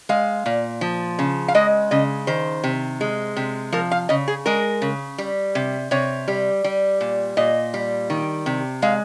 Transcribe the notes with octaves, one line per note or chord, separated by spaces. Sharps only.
G#3 F5
A#2
F3
C#3
F5
G#3 D#5
C#3 D#5
D#3 C5
C3
G#3
C3
F3 A#4
F5
C#3 D#5
G#4
G#3 A#4
C#3
G3
C3
C3 C#5
G3
G3
A#2
A#2 D#5
G3
D#3
C3
G#3 F5